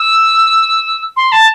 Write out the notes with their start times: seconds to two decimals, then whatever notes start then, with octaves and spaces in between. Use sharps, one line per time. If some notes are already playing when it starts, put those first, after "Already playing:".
Already playing: E6
1.16 C6
1.32 A5